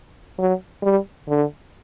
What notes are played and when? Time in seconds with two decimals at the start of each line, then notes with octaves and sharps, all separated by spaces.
0.39 F#3
0.83 G3
1.29 D3